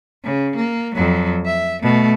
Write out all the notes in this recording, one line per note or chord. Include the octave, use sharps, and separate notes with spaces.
C#3
A#3
F2 F#3
E5
B2 A3